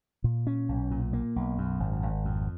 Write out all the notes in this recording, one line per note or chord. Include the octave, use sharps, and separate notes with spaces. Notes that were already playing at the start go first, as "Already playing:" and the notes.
A#2
C#4
B1
A#2
A#3
B1
F#2
G#1
G#1
F2